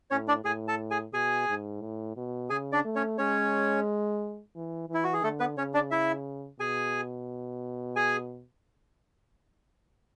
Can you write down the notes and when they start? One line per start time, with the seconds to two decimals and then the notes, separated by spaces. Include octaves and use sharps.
0.11 A2 C#4 C#5
0.28 D4 D5
0.45 A2 G#4 G#5
0.68 A4 A5
0.91 G#4 G#5
1.13 B2 G#4 G#5
1.48 G#2
1.82 A2
2.16 B2
2.50 C#3 G#4 G#5
2.72 D4 D5
2.85 A3
2.96 C#4 C#5
3.18 G#3 C#4 C#5
4.56 E3
4.89 E3
4.94 E4
5.04 F#4
5.13 G#4
5.23 D3 A3 A4
5.40 B3 B4
5.57 C#3 C#4 C#5
5.74 D4 D5
5.91 E4 E5
6.59 B2 G#4 G#5
7.96 G#4 G#5